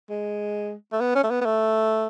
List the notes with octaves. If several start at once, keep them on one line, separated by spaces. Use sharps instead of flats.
G#3
A3
B3
C#4
A3
B3
B3
A3